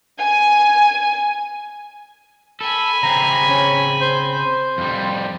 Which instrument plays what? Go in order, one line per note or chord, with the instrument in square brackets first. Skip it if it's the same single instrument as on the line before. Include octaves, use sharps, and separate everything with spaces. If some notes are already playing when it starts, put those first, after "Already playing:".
[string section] G#5
[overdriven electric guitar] A4 [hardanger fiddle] G#5 B5
[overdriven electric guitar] C#3 C4 [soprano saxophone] A#5
[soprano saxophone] C#4
C5
C5
[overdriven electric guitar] F2 G3